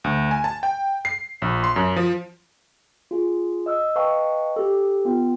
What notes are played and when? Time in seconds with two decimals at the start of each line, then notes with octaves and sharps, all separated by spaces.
0.04 D2
0.31 G#5
0.44 A5
0.63 G5
1.05 C7
1.42 A#1
1.64 C6
1.76 F#2
1.96 F3
3.11 F4 G#4
3.66 D#5 E6 F6
3.96 B4 D#5 F5 G5 A5 C#6
4.56 G4 A4
5.05 B3 F4 G5